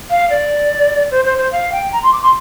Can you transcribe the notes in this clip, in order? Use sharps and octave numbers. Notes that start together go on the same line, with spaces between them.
F5
D5
C5
C5
C5
F5
G5
A#5
C6
D6
C6